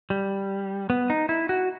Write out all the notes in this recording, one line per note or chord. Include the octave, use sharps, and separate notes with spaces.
G3
B3
D#4
E4
F#4